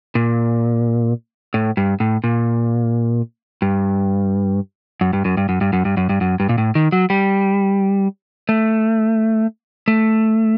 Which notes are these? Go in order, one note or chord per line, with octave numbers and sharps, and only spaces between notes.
A#2
A2
G2
A2
A#2
G2
F#2
G2
F#2
G2
F#2
G2
F#2
G2
F#2
G2
F#2
G2
A#2
A2
D#3
F#3
G3
A3
A3